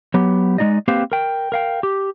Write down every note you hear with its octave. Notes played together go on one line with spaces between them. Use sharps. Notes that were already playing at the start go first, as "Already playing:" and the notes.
F#3 B3 G4
G#3 A3 D#4 D5 D#5
A#3 C4 G4 B4 C5 F5
A#4 G5
A#4 F5 G5
G4